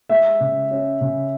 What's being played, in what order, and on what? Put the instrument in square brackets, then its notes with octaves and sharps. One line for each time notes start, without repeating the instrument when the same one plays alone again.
[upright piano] G#3 [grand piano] E5
[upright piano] C#3
C#4
C#3